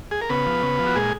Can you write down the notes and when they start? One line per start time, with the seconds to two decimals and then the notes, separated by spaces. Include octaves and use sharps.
0.11 G#4
0.21 A#4
0.30 C#3 B3 B4
0.46 F3
0.63 C#3
0.79 F3
0.87 F#4
0.95 A#2 G#3 G#4